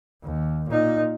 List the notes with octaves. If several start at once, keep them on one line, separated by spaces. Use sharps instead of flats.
D#2
A#2 D#4